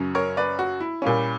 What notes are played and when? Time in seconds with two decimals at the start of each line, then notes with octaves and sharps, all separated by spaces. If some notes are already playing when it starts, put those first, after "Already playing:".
Already playing: F#2 C#3 F#3 C#4
0.15 A#4 C#5
0.37 B4 D5
0.59 F#4
0.80 E4
1.02 A#2 G3 A#3 C#4